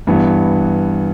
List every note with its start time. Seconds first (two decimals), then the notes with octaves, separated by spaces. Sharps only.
0.07 G2 E3 B3